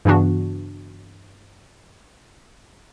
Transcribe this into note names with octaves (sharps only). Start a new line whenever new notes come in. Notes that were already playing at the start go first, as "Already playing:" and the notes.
G2 C#3 E3 B3 D4 F#4